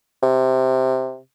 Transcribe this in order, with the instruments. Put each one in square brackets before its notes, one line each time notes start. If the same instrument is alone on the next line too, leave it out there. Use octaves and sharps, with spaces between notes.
[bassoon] C3